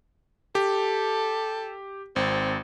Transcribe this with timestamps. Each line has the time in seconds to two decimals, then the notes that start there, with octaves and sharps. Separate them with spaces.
0.55 G4 A4
2.16 G#1 C4